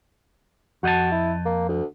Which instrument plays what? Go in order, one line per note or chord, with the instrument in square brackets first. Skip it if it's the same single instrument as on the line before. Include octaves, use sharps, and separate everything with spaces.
[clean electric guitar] F2 D#5 A5 [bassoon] F#4
[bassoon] E4
A#3
D2